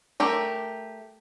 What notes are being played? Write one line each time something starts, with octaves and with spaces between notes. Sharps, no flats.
A3 G4 A#4